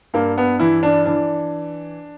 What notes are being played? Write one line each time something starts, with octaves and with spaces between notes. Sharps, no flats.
G2 A#3
B3
E3 E4
D4
E3 D4